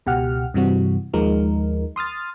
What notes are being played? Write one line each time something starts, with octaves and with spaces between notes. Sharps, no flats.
C#2 B2 G4 F#5 F6
G2 C3 E3 G3 C4 F#4
D#2 F3 G#3 D#4 A#4
C6 D#6 F6 A6